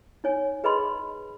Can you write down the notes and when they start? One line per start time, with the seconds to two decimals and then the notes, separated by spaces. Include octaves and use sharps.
0.24 D#4 C#5 G#5
0.64 G#4 B4 D#5 B5 C6